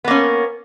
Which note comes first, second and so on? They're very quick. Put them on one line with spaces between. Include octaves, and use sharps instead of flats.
B3 A#3 C#4